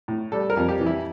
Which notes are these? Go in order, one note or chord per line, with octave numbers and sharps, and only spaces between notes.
A2
G3 A4
A#4
F2
G4
E3
E4